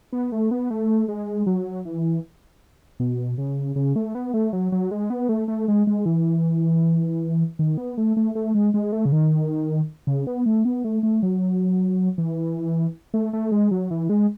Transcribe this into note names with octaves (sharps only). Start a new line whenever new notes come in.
B3
A3
B3
A3
G#3
F#3
E3
B2
C#3
C#3
A3
B3
A3
F#3
F#3
G#3
B3
A3
A3
G#3
G#3
E3
D#3
B3
A3
A3
A3
G#3
G#3
A3
C#3
D#3
C#3
B3
A3
B3
A3
A3
F#3
E3
A3
A3
G#3
F#3
E3
G#3